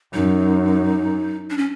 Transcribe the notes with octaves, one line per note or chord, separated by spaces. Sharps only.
F#2 D#4
D4
C#4